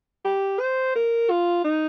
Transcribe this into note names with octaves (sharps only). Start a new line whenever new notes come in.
G4
C5
A#4
F4
D#4